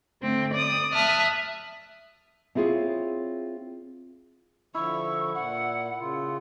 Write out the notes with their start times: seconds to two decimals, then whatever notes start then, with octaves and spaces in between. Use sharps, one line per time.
0.21 D3 A3 C4
0.51 D5 D#6
0.93 E5 A5 D#6 F6 F#6
2.55 C4 E4 F4 G#4 C#5
4.75 D3 F3 E4 C#6
5.34 A#2 F#5
5.99 C#3 F4